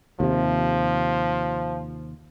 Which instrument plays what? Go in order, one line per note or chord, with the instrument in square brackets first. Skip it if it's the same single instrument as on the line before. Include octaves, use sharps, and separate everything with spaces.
[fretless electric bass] D#2 C3 [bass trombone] F3